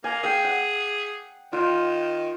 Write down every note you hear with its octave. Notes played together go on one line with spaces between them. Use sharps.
A#3 G#5
G#4 F5 G5
F#5
D#3 F4